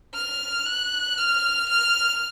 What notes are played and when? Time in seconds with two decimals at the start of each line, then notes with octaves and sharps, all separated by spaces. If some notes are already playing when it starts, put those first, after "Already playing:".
0.15 F6
0.66 F#6
1.18 F6
1.70 F6